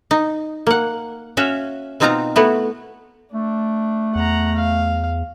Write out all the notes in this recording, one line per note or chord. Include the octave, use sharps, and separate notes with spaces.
D#4
A#3 F#5
C#4 F#4 E5 F5
B2 C4 D#4 F4 F5 A#5
A3 B3 E4 F#4
A3 D4
E2 F#5 A#5
F5